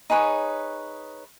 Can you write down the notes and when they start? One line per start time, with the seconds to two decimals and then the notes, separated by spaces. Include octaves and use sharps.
0.10 D#4 G#4 B4 C#5